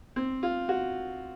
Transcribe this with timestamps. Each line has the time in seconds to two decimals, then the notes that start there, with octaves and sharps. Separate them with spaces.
0.16 C4
0.43 F4
0.69 F#4